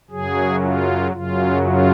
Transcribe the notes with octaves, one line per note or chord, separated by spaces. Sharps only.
F#2 C#3 F#3 G#4
F4
F#2 C#3 F#3 F4
F4